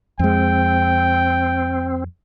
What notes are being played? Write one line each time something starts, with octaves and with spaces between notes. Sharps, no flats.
F2 G#3 C4 G5